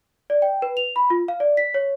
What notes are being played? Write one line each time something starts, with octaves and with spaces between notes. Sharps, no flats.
D5
G5
B4
F7
B5
F4
F5
D5
B6
C#5